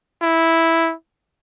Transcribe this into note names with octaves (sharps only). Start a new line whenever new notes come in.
E4